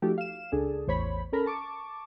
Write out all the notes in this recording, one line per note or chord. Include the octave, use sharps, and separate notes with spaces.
F3 A3 D#4 F#4 G4 A4
F5 E7
C#2 D4 G#4 A4
A1 E2 C5 C#5 B5
C#4 A4 A#4 A#5 B5
A5 C#6 D6